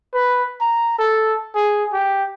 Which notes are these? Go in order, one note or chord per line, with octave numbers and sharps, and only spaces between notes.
B4
A#5
A4
G#4
G4